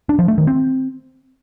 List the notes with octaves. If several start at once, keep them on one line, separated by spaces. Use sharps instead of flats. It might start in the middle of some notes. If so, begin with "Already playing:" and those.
D4
F3
A3
D#3
C4